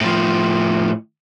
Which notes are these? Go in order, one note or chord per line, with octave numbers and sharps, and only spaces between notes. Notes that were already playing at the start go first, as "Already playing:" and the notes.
A2 F3